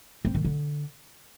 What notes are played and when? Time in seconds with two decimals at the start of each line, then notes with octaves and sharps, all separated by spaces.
0.25 C4
0.35 D#3
0.45 D3